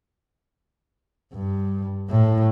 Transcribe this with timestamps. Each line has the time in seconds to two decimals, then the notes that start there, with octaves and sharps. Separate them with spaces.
1.33 G2
2.10 A2